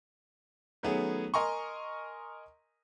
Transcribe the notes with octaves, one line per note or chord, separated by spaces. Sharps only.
D#3 F#3 A3 B3 C#4 G#4
A#4 D#5 G#5 A#5 C6 C#6